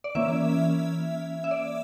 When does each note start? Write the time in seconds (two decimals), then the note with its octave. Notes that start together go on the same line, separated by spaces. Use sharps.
0.04 D5
0.15 E3 A#3 C#4 E5
1.44 E5
1.51 D5